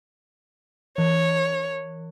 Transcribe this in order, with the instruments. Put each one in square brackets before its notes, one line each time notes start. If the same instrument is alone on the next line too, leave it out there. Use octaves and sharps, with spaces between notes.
[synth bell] E3 [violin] C#5